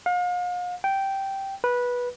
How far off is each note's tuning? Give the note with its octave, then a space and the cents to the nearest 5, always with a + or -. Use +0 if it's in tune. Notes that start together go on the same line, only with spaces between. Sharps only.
F5 +40
G5 -10
B4 -15